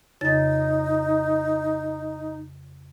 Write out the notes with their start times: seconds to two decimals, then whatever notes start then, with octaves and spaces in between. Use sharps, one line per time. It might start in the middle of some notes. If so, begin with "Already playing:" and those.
0.21 F2 C#3 D#4 A6